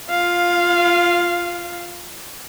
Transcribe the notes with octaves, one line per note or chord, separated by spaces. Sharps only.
F4 F5